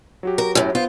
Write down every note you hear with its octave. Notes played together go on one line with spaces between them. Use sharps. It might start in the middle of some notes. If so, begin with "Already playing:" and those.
F#3 F#4 G4
A#4
F#2 A2
B3 F4 C5